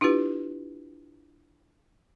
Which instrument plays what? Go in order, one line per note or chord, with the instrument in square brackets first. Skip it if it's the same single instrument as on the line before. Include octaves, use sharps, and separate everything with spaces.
[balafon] D4 E4 F4 G4 B4